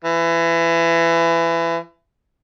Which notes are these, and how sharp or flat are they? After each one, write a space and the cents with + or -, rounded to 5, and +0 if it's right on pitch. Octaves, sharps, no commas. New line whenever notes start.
E3 +25